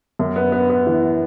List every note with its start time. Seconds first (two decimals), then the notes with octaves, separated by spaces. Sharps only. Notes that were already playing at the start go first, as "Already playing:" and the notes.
0.19 F#2
0.36 B3
0.52 B3
0.70 B3
0.87 E3